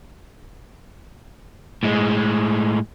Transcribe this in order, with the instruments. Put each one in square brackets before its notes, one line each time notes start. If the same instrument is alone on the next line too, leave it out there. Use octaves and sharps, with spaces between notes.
[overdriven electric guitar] A2 G#3